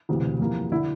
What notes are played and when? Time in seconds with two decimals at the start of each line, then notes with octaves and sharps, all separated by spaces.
0.09 E1 D2 C3 E3
0.39 F2 E3 G3 A#3
0.72 D3 E4